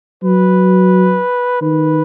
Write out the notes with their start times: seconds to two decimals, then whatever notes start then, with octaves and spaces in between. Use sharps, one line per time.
0.24 F#3 B4
1.61 D#3 B4